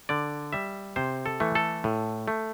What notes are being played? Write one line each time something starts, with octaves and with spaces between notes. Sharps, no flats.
D3 D5
G3 E5
C3 C5
A4
E3 A3
A4
A2
A3